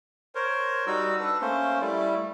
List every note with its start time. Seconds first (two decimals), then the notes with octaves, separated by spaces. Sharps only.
0.35 A#4 C5 C#5
0.87 G3 D#4 F#4 E6
1.20 D4 A4 B4
1.41 A3 A#3 C#4 C5
1.81 G3 A3 E4